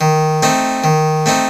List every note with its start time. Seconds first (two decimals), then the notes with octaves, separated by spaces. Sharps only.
0.01 D#3
0.43 A3 C4 D#4
0.84 D#3
1.26 A3 C4 D#4